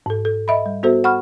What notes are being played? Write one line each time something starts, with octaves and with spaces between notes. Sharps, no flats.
G#2 A4
A4
D#5 E5 B5
G3
B3 F#4 A4 C5 E5
F#5 B5 C#6 F6